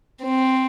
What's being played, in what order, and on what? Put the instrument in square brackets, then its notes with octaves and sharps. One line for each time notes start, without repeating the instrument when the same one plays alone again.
[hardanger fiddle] C4